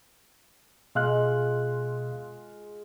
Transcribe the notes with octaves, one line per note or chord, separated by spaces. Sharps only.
B2 G#3 F4 F5 F#6